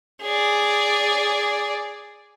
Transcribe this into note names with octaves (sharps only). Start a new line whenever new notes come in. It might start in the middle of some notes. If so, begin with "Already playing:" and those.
G#4 D5